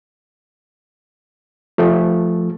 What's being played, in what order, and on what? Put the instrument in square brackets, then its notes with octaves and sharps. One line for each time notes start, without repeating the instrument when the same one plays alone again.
[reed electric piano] F3 A3